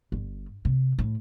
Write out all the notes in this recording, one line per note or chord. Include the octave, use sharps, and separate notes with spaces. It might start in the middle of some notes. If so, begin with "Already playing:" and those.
G1
C3
A2